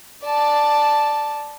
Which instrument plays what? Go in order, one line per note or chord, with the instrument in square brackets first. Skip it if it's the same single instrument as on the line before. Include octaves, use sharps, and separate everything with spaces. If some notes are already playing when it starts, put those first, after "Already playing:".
[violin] D5 A5